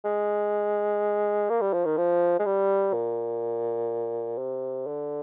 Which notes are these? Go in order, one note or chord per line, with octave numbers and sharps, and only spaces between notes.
G#3
A#3
G3
F3
D#3
F3
G#3
G3
A#2
C3
D3